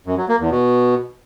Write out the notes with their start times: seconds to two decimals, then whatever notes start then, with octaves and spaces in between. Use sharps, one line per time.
0.07 F#2
0.18 F#3
0.29 A#3
0.40 E2
0.51 B2